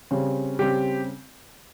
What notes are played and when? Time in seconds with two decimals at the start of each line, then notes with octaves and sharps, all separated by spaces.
0.11 C#3 G3 C4
0.59 C#3 G3 C4 G4